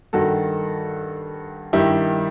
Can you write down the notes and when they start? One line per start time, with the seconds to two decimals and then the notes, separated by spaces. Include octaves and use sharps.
0.13 G2 D#3 F#4 A4
1.73 G2 D#3 E4 G4